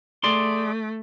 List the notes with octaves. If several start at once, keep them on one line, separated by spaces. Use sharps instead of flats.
A3 G#4 D5 C6